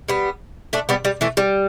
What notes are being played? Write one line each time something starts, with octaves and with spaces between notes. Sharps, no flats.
G3 B3
A3 D4
G3 B3
G3
E3 A3
G3